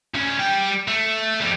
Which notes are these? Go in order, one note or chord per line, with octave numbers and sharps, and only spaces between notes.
D2 C#4
G3 G5
A3
F2 G3